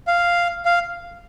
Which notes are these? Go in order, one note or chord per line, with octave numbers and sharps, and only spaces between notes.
F5
F5